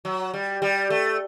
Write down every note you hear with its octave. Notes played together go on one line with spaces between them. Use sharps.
F#3
G3
G3
A3